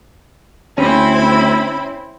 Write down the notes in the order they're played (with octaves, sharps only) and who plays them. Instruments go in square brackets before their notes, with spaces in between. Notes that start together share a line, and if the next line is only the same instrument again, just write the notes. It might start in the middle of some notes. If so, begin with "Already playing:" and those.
[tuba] D2 [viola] C4 E4 [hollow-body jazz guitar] C#4 [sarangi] B5